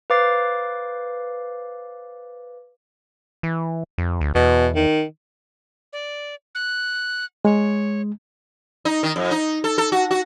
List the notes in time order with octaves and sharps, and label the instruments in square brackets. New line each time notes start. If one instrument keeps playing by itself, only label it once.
[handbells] B4 C5 F5 D6 A6 C7
[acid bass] E3
F2
D2
[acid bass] E2 [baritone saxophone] B2
[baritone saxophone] D#3
[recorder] D5
F#6
[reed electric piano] G#3 [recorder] C#5
[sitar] D#4
D#3
F2
D#4
A4
A4
F#4
F#4